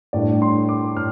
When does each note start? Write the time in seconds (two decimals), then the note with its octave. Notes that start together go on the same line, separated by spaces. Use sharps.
0.13 A2 G3 D4 D5
0.42 C6
0.69 D6
0.97 A2 F6